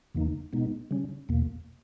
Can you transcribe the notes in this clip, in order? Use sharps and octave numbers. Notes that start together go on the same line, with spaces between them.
E2 C#3 E3 A#3 D#4
B2 G#3 B3 D#4
C#3 G3 C#4
E2 B2 A#3